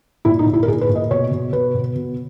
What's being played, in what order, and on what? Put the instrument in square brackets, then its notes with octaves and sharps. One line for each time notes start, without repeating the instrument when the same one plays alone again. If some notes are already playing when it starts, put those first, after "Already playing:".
[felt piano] A#2 E4
D#4
A#2
E4
A#4
A#2 G#4
B4
A#2
D#5
B2 C#5
B2
B2 B4
B2
B2